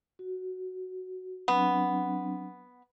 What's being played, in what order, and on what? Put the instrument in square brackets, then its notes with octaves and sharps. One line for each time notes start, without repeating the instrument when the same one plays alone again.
[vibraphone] F#4
[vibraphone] F#3 C4 D4 [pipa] B3